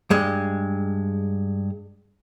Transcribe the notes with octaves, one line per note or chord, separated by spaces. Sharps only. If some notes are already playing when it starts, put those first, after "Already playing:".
G2 G#3